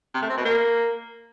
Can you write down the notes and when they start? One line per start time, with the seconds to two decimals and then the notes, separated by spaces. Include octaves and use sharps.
0.14 C3
0.22 A3
0.30 C4
0.37 B2
0.45 A#3